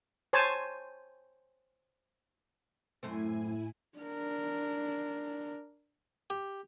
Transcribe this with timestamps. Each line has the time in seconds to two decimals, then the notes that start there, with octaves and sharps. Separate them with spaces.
0.33 C5 C#5 G#5 A5
3.03 F#2 A2 A3 C4 E4 G#5
3.98 D4 A#4
6.30 G4